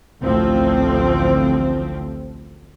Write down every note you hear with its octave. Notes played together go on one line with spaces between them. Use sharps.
A1 D2 F3 C4